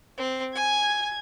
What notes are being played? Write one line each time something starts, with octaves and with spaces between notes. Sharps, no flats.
C4
G#5 G#6